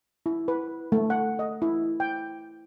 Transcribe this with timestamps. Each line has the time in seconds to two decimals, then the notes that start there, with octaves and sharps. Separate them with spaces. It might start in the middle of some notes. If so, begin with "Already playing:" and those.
0.26 E4
0.48 B4
0.92 A3
1.10 F#5
1.39 D#5
1.62 E4
2.00 G5